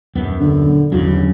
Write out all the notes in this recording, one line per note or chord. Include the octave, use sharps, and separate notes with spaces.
D#1 F#2 B3
D3
G1 E2 C#3 F#3